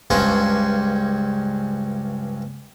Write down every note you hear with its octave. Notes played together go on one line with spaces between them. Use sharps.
C#2 G2 C#4 C5